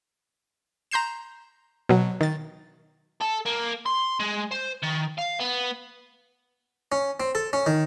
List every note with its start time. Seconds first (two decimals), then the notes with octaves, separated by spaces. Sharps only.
0.91 A#5 C6 G6 C7 E7
1.89 B2 F#3
2.21 D#3 A6
3.22 A4
3.46 A#3
3.86 C6
4.20 G#3
4.51 C5
4.83 D#3
5.18 F5
5.39 B3
6.92 C#4
7.20 C4
7.35 A4
7.53 C#4
7.66 D#3